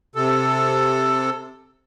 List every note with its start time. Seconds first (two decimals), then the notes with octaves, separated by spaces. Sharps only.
0.15 C3 A4